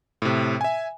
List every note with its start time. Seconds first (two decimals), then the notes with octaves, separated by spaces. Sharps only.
0.22 A2 C3
0.61 E5 G#5